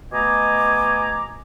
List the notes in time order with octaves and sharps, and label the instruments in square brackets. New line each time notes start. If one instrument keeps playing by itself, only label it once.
[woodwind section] B2 A3 D#5 G#5 A#5 D6